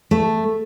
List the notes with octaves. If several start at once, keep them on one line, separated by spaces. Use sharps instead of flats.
A3